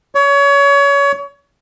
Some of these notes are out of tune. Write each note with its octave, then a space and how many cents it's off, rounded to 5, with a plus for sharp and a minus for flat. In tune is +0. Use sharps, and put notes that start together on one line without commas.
C#5 +25